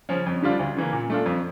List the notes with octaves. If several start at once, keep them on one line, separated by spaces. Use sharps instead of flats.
C#3 F3 C#4
F2
D3 G3 D4 F4
D2
C#3 E3 A#3
A#2
A3 D4 F4
F2